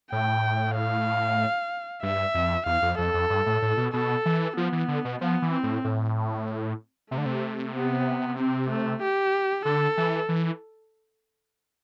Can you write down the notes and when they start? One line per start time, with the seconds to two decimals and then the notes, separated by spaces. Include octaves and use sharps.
0.12 A2 G5
0.76 F5
2.03 G2 E5
2.34 F2
2.66 E2 F5
2.82 F2
2.98 F2 A4
3.14 F2
3.30 G2
3.46 A2
3.62 A2
3.77 B2
3.93 B2 A4
4.26 E3
4.57 F3 B3
4.72 E3
4.88 D3
5.05 B2
5.21 F3 B3
5.42 E3
5.52 C4
5.63 A2
5.84 A2
7.11 C3 A3
7.18 D3
7.26 C3
7.75 B3
8.38 C4
8.70 A3
9.02 G4
9.65 D3 A4
9.98 E3
10.29 E3